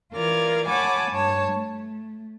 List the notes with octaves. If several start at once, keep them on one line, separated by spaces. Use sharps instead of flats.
E3 F4 A#4 D5 F6 G#6
C#5 F#5 G#5 A5 B5 D6
G2 C#5 A5
A3